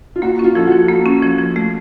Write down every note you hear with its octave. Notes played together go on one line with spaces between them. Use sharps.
F4
A#3 F#4
C#4 F4
F3 A4
F3 F#4
A#3
C#4
F3
F3
A3